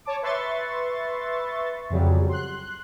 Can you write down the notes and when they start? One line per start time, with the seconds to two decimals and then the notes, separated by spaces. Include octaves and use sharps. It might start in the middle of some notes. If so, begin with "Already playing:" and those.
0.05 C#5 A5 D6
0.22 B4 E5 C6 C#6 A6
1.90 F2 C#3 F#3 G3
2.29 C6 F#6